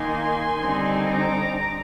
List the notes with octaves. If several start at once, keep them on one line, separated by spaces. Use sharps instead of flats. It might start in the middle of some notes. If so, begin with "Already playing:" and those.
Already playing: D#3 A#3 D#4 G#5 C6
D3 G3 C4 D#4
A#5 D6